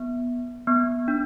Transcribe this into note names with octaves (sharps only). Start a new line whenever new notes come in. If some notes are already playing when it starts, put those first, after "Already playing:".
Already playing: B3
B3
D4